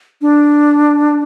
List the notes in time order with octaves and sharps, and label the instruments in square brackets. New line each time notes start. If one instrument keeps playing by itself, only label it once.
[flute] D4